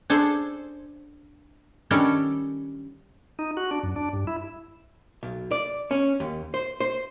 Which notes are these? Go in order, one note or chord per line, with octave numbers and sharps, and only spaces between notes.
D4 G#4 A4 C5
D#3 G3 C#4 D4 A4
D#4
F#4
D4
F#2
D4
G2
E4
B1
D5
C#4
D#2
C5
C5